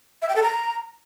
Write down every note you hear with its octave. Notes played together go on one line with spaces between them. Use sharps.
E5
G5
A4
A#5